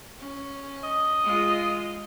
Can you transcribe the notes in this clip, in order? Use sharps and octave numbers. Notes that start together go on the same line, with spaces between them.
C#4
D#5
G#3 F4